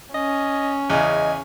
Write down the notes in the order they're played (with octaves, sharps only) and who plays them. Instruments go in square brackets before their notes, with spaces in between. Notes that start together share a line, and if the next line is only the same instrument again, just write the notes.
[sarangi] C#4 [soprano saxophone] D#5
[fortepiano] E2 C#3 [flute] D#5 [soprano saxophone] G#5